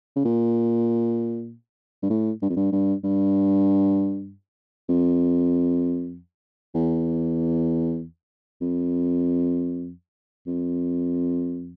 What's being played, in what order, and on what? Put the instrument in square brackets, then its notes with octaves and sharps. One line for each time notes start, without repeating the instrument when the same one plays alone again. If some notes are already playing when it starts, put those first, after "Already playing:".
[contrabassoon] C#3
A#2
G2
A2
G2
F2
G2
G2
G2
F2
E2
F2
F2